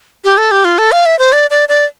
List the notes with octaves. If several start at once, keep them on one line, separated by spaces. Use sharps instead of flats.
G4
A4
G4
F4
A4
F5
E5
C5
D5
D5
D5